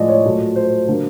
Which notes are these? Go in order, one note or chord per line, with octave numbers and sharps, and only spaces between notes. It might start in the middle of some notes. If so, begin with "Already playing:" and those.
Already playing: A2 F3 G#3 D5 D#5
C#5
A#2 F#3 A3
C5
D3 F#3 A#3